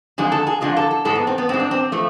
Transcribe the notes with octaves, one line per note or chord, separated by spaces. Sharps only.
F2 D3 G#3 G#4
A4
G#4
F2 D3 G#3 F4
A4
A4
G#2 G#3 A4
B3
C4
B3
G#2 G#3 C4
D4
C4
F3 A3